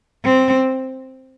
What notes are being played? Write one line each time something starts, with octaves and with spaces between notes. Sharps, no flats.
C4